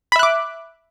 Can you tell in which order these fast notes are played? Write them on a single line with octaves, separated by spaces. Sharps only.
B5 E5 F#6 D6